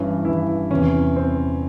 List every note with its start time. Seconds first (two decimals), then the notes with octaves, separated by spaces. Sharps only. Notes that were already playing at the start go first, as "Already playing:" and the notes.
Already playing: G2 E3 C#4
0.25 G2 E3 E4
0.71 E2 C3 E3 C#4
1.16 C4